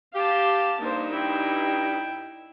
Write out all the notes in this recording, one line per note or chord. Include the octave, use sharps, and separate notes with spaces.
G4 F5 A5
G2 A#3 D#4 C5
E4 G5